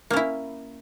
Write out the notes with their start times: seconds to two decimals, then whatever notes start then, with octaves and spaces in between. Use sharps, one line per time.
0.10 A#3
0.13 C#4
0.16 E4